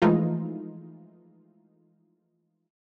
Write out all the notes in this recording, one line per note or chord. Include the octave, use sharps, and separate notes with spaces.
E3 F3 G#3 A3 D#4 F4